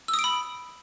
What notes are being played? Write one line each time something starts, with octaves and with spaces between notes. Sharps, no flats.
E6
D#6
D7
B5